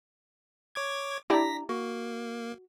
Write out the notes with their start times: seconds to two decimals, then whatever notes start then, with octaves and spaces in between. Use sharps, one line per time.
0.75 C#5 D6 G#6
1.30 D4 E4 G4 D5 A#5 A#6 B6
1.69 A#3 F#4